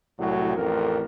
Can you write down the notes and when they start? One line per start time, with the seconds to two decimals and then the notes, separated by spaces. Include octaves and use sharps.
0.18 C2 A2 F#3
0.56 A1 F2 A#4